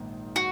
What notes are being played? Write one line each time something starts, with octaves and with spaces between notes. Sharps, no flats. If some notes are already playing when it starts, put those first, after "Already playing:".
Already playing: A#1 G#2 D#3 A#3
F#4